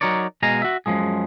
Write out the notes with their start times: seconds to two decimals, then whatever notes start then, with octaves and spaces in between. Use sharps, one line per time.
0.01 F#3 D#4 A#4 C#5 D5
0.42 B2 G#3 F5 G#5 A#5
0.62 F#4 E5
0.86 F#2 D#3 F3 G#3 G#4